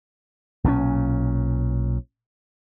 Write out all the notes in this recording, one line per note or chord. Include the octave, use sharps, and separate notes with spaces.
B1 A#2 E3 C#4